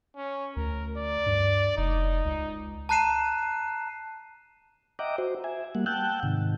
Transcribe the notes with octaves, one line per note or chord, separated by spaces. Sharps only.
C#4
D2 A#4
D5
G2
F1 D#4
C#2
A5 A#5 F#6 C7 D#7 E7
D#5 E5 F#5 G5 A#5 D6
F#4 C5
E5 G#5
G3 A#3 F#5
F#5 G5 A5 E6 F#6 G6
G#2 C3 D#3